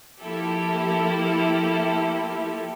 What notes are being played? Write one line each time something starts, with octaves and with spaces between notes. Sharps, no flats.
F3 A#3 E4 G4 A4